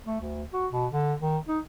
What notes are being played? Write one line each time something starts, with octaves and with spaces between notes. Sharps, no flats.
A3
D2
F#4
B2
D3
D#3
D#4